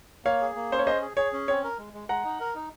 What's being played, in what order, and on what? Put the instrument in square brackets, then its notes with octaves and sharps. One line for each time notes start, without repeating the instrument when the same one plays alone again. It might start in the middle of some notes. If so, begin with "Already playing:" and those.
[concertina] A#3 [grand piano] C#5 F5
[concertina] G#4
A#3
[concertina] C#4 [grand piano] C5
[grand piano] C#5
[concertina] G#4 [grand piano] C5 D#5
[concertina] G#4
[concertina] G#4 [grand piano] C#5
[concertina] C#4
[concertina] C4 [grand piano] C#5
[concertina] A#4
G#3
G#3
[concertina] G#3 [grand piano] F#5 A#5
[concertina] D#4
A#4
D#4